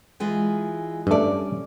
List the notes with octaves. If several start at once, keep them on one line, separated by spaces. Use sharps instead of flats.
E3 G#3 F4
G2 A3 C#4 D5